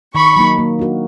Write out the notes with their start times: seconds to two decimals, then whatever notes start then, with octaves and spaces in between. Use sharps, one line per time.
0.15 D#3 B5 C#6
0.36 F#3 A#3 D#4
0.58 A#3
0.79 D4 F#4 A#4